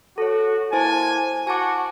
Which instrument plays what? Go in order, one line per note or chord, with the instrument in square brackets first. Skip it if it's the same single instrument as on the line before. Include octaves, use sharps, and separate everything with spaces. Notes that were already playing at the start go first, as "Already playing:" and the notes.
[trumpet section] F#4 [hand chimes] A4 C#5
[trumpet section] A#3 G#5 [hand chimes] E4 C5 A5
[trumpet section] F#4 [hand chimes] G#5 A5 D6